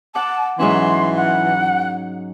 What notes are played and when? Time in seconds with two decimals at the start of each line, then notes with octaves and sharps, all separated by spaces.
0.15 F#5 A5 D6
0.59 G#2 E3 F#3 C#4 C6
1.16 F#5